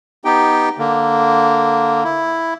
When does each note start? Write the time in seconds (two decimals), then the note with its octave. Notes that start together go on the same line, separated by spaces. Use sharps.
0.25 B3 D#4 G4 G5
0.78 D3 A#3
2.04 E4